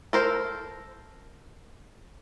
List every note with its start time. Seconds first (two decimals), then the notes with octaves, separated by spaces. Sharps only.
0.13 A4 A#4 C5